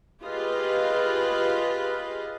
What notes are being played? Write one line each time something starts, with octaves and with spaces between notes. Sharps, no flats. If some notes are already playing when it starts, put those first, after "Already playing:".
F4 G4 G#4 B4 D#5 F5